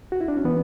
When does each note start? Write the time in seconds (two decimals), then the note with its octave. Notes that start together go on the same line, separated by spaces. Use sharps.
0.12 F#4
0.21 E4
0.28 D4
0.37 C#4
0.45 E3 B3